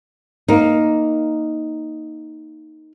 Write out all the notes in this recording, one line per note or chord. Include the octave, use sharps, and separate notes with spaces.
A#3 D#4